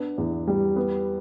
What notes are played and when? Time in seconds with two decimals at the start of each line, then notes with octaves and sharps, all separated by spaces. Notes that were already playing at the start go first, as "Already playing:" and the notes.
Already playing: B3 D4
0.18 E2
0.48 G3
0.76 B3